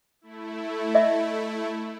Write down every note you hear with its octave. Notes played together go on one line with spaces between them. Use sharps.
A3 E4
D#5 E5